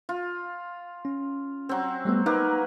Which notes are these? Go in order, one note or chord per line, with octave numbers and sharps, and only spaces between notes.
F4
C#4
F#3 C4
G3 A3 B3
A#3 D#4 B4